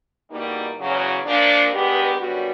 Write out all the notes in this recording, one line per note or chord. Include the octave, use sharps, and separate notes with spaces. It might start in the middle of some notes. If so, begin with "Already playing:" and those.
E2 B2 G3 A#3 D#4
E2 C#3 F#3
A#2 F3 A#3 D4
G2 D#3 G#3 B3 G4
F#2 D3 G3 B3 F#4